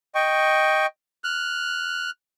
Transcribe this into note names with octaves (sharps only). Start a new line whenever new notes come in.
D#5 G5 C#6
F6 F#6